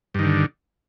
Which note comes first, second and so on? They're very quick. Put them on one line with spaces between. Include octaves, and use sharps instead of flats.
G2 D#3 D3